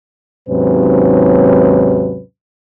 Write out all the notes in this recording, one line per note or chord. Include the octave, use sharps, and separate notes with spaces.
D#2 G#2 C3 F#3 C#4 B4